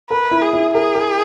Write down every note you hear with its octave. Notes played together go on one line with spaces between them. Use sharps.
A#4 B4
E4
G#4
E4
G#4 A#4
A#4